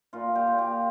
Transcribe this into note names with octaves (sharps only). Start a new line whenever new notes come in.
A#2 F4
G4
A#2
G4